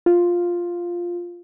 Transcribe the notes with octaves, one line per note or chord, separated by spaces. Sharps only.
F4